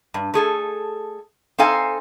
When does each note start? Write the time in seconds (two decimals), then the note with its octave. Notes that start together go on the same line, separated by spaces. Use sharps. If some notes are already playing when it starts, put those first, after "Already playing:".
0.14 G2
0.34 A3 G#4 A4
1.58 C4 D#4 A4 F5 G#5